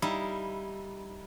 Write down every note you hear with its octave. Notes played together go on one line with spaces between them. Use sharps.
G3 D#4 E4 F5